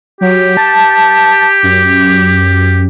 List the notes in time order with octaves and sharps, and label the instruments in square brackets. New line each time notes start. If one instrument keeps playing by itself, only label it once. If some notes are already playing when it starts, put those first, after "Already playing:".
[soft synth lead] F#3 [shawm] G4
[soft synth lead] A5
F#2